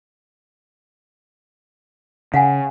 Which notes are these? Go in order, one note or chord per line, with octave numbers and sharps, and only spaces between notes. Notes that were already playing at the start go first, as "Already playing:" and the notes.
C#3 F5 F#5 G#5